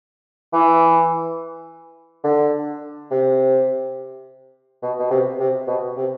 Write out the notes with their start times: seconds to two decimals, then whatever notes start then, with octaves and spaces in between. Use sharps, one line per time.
0.53 E3
2.24 D3
3.11 C3
4.83 B2
4.99 B2
5.10 C3
5.40 C3
5.67 B2
5.97 C3